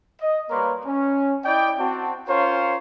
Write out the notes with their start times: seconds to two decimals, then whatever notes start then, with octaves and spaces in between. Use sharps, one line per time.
0.21 D#5
0.50 G3 A#3 A#4 B4 C#5 C6
0.85 C#4
1.45 E4 D5 D#5 G5
1.78 C4 F#4 A5
2.28 C#4 F4 A#4 C5 C#5